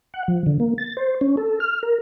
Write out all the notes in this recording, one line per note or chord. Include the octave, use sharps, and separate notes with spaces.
F#5
F3
D3
A#3
A6
C5
C#4
A4
F6
A#4